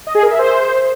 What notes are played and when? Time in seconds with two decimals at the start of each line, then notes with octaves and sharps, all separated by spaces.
0.07 D#5
0.15 G#4
0.23 A#4
0.31 E5
0.39 C5